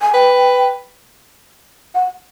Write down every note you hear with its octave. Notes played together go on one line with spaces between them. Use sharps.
G#5
B4 G5
F#5